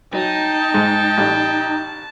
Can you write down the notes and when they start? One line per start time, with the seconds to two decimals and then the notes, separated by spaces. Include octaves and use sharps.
0.14 F#3 D#4 G5 A5
0.74 G#2
1.18 A1 G3